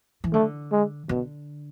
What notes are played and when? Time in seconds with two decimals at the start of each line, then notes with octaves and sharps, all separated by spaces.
0.24 E3
0.33 D3 A3
0.72 G#3
1.09 B2 D3